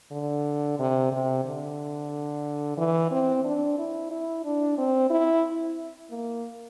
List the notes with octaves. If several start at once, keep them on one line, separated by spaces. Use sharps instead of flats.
D3
C3
C3
D3
E3
C4
D4
E4
E4
D4
C4
E4
A#3